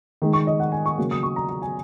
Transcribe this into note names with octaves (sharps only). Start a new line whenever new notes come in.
D#3 G#3
C#6
D#5
F#5
G#5
C#6
C#3 F#3 A#3
D#6
C#6
A#5
A#5
G#5